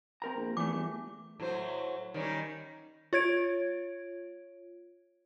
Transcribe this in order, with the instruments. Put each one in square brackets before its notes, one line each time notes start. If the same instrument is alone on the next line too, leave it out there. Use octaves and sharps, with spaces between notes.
[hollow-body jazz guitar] C4 A#4 A#5
[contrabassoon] A#1
[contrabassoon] E2 [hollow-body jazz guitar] E3 A3 [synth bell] D6
[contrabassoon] G1
[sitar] A2 F#3 C5
D#3 G3 C#4
[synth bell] F4 C#5 G#6 D7